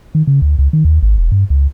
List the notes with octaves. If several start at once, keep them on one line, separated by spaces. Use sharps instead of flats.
D#3
C#3
D2
C#2
D#3
D#2
G#1
E1
G2
C#2